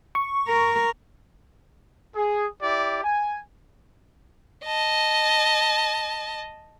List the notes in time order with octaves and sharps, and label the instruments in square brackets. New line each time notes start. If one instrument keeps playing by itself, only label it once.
[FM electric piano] C#6
[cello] A#4
[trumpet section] G#4
E4 G4 D5
G#5
[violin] D#5 A5